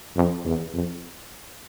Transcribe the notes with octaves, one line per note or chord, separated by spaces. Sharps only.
F2
E2
F2